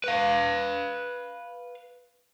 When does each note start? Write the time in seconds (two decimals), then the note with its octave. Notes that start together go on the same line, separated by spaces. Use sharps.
0.04 B4 F5